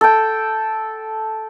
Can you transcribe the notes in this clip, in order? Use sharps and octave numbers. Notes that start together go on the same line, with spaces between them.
A4 G5